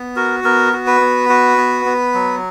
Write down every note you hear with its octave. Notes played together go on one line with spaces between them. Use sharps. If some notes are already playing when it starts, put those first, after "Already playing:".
Already playing: B3
F#4 A#4
B3 A#4
F#4
B4
B3
F#4
B3
B3
F#3